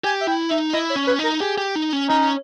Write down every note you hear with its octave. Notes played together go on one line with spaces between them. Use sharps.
G4 G#5
E5
E4 G5
D#4 E5
E4 D#5
C#5
C#4
B4
D#4 A#4
G4 G#4
G4
D#4
C#4
C#4 D#4